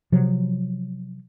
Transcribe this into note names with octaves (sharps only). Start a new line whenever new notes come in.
C3 F3 F#3